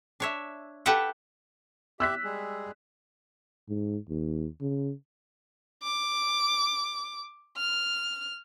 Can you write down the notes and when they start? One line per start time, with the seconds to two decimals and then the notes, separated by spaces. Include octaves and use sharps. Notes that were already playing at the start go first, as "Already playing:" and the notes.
0.20 D4 C#5 E5
0.86 G4 A4 B4 E5 F#5 G5
2.00 G4 E5 E6 F#6 B6
2.24 G3 G#3 G#4
3.69 G#2
4.09 D#2
4.61 C#3
5.82 D6
7.57 F6